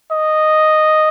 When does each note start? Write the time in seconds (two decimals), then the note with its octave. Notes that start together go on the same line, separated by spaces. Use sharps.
0.11 D#5